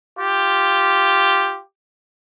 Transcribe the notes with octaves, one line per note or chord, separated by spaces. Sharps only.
F4 G4